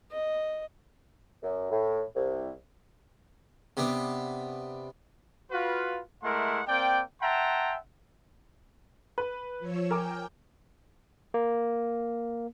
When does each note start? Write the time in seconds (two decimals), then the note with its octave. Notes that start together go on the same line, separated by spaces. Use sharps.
0.11 D#5
1.43 F#2
1.71 A2
2.15 C2
3.77 C3 B3 D4
5.51 F4 F#4 B4
6.23 G#3 A3 E4 A#4 F#5 C6
6.68 A#3 C4 D5 G5
7.22 E5 F#5 G5 A5 A#5 C6
9.18 B4
9.59 F3 C#5 E6
9.91 A#4 G5 G#5 D6
11.34 A#3